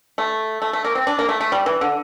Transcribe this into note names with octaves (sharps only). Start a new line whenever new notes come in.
A3
A3
A3
A#3
C4
D4
A#3
A3
A3
G3
E3
D3